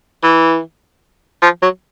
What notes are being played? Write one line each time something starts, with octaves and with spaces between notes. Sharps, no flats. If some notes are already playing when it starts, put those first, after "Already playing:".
E3
F3
F#3